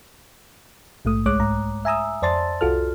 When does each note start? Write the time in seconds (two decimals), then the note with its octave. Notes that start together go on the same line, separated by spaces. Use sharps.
1.05 A#1 G#2 A3 D#6
1.26 C2 G#3 C#5 D6 F#6
1.40 G#2 A#5
1.85 E5 G#5 A#5 D#6 E6
2.22 F2 C5 D5 A5 C6 A6
2.61 C2 F4 F#4 A4 F6